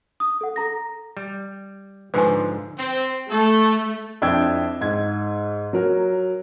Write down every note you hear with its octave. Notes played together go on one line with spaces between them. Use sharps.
D#6
A4 F#5
A4 A#5 A#6
G3
G#2 D3 F3 B4 G#5
C4
A3 A4
F2 D4 E4 G5 E6 G#6
G#2 G#6
F#3 A#4